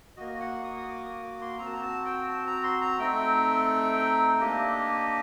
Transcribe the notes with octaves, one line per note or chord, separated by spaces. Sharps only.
A#3 F#4 D#5
F#5
D#6
D#6
D6
D#6
D6
C6
C4 F#4 A#5
A5
A#5
A5
G5
A5
A#5
C6
A#5
A3 C4 D#4 G5
A#3 D4 G4 D#5